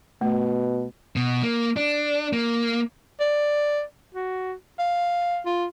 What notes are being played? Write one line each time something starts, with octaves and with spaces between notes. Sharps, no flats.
B2 A3
B2
A#3
D4
A#3
D5
F#4
F5
F4